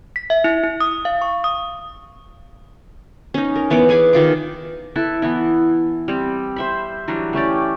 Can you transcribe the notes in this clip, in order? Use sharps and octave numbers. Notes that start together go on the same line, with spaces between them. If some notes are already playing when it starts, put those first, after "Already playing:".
B6
E5
E4
E4
D#6
F5
C#6
D#6
C#4 D#4
A#4
E3 B3 C#5 D6
G#4 B4 G#5 D6
D#3 F4 D6
E4 A4 B4
E3 B3 E4
G3 C4
C5 E5 B5
E3 F#3 G3 D4
A3 C#4 G4 D5